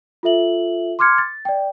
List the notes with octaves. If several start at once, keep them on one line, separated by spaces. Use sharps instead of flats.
F4 A4 E5 F#7
C6 D6 F6 G#6 C#7
A6
D5 G5